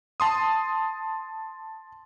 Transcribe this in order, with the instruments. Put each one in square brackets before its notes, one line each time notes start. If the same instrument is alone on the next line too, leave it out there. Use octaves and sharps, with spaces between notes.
[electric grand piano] A5 C6 D#6